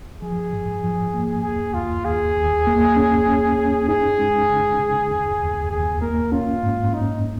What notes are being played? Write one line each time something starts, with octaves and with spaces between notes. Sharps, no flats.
F3 G#4
G#2
F3
A#3
D#2 G#4
D#2 F4
D#2 G#4
D#2
A#3
C#4
C#4
C#4
D#4 G#4
G#3
C#3
C#3
D#2
D#2
D#2 G#4
A#3 A#4
C#4 F4
G#2
C#4 D#4